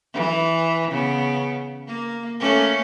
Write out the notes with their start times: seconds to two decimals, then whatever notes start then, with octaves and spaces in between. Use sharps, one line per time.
0.14 E3
0.91 C#3 B3
1.87 A#3
2.40 A3 A#3 C#4